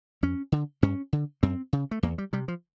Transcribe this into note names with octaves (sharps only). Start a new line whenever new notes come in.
F2 C#4
D3
G2 C#4
D3
F#2 C4
C#3
A3
E2 A#3
G3
C3 G3
F3